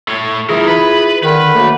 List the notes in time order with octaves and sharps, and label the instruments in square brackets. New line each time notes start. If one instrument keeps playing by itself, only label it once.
[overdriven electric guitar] A3 C#5
[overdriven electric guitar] E3 A#4 [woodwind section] E4 F4 G#4
[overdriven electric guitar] B4
[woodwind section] D3 D#3 [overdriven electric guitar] B4
[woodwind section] F#3 A3 A#3